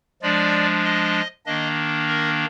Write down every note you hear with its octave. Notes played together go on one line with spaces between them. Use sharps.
F3 G#3 D4 D5
D#5
D#3 A#3 D4 D#5
A#4